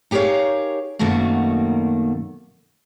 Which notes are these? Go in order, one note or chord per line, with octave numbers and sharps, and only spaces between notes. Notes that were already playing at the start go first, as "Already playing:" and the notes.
D#4 G4 G#4 A#4 C#5 F5
F#2 B2 D#3 A3 A#3 F#4